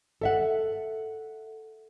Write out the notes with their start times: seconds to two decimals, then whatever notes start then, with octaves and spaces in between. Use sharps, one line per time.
0.21 A4 E5 F#5